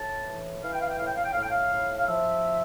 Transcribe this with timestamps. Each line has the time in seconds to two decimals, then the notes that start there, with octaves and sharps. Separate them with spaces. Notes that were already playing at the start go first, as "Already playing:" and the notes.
Already playing: A2 A5
0.28 E3
0.64 E3 F5
0.73 G5
0.81 F5
0.90 G5
0.99 A2 F5
1.07 G5
1.16 F5
1.25 G5
1.33 A2 F5
1.42 G5
1.51 F5
1.72 A2
1.98 F5
2.08 F3 E5